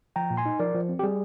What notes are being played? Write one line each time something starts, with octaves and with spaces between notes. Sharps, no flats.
F3 G5 A#5
A#2
G#5 C6
D#4
F3 A#4 D5
F3
C4
G4
G3 G#4